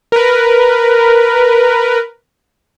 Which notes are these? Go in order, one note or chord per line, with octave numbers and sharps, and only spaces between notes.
A#4 B4